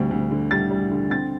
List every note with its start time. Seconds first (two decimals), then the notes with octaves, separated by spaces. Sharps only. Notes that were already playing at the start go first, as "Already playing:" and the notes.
Already playing: D2 D3 G3 C4
0.11 D2
0.31 D3
0.51 G3 A6
0.70 G3
0.91 D3
1.10 C4 A6